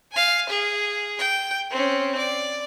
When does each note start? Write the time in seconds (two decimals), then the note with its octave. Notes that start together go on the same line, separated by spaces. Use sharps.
0.12 F5 G#5
0.49 G#4
1.19 G5
1.70 C4 C#4
2.18 D5